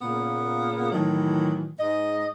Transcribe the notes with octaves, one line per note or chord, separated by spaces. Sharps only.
A#2 C#3 A#3 B3
A2 D#3 E3 F#3
G#2 D#5